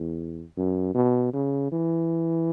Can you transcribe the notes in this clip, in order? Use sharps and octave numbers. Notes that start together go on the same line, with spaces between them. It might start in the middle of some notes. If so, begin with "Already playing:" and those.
Already playing: E2
F#2
B2
C#3
E3